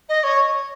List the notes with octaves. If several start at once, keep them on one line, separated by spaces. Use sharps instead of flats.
D#5
C#5